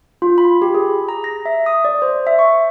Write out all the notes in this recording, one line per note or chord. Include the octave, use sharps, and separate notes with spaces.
F4
B5
G4
G#4
A#5
A#6
E5
D#6
D5
C5
E5
C#6